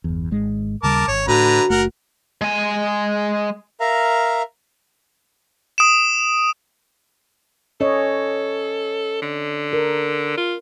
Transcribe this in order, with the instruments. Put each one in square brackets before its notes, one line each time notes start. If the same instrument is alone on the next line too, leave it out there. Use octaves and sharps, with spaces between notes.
[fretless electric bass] G1 E2
G#1 G#2 G#3
[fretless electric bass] D#2 C#3 G3 [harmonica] A#4 A5 D6
[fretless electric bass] G#1 [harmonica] C#5
[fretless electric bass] A2 [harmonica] D3 B4 A#5 [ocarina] F#4
[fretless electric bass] F#1 A3 [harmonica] A#4 F#5
[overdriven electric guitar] G#3 G#5
[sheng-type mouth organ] A#4 E5 F5 A#5
[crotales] D#6 D7 E7
[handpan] C#4 C#5 D#5 [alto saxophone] A4
[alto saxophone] D3
[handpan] A#4
[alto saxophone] F4